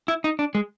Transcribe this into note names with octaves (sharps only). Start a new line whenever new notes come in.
E4
D#4
D4
G#3